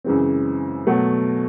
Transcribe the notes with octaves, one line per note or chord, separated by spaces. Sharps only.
F#2 C#3 E3 G#3 C4
B2 F#3 A3